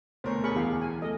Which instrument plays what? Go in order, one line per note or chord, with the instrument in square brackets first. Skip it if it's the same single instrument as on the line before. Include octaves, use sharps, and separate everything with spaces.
[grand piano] D2 B2 A#4 [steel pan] C5 C#5
[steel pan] G#4 B5 C#6 [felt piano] F6
[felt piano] E2 [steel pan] G4 F5
[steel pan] G#5
[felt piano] A3 [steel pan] D#5